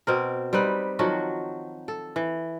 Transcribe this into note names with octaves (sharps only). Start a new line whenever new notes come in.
B2 C4 A#4
G3 C4 D#4 B4
D#3 F3 F#3 F#4
A4
E3